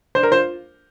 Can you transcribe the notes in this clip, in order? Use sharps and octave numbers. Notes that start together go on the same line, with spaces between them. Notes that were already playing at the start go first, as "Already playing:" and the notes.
D4 C5
A#4
F4 C5